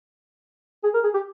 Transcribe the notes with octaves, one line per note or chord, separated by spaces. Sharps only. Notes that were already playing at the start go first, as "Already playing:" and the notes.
G#4
A#4
G#4
G4